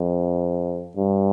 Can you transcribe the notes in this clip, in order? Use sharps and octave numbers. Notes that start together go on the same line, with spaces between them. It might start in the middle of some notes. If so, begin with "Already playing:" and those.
Already playing: F2
G2